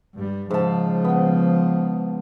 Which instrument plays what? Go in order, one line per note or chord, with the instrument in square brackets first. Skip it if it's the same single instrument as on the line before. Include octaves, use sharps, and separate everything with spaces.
[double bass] G2 G3
[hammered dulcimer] G#2 A5 [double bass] C#3 F3
[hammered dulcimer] B3